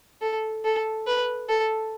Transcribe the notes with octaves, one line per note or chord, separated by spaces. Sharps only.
A4
A4
B4
A4